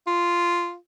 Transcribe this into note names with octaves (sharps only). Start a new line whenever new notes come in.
F4